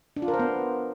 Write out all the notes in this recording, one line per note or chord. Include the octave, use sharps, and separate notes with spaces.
D4
F4
A#4
C5
B3